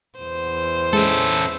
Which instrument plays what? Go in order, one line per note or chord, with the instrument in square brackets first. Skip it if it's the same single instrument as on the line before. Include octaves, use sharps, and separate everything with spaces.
[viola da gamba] E2 C5
[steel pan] G#3 [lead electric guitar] C#4 A4 [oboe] E5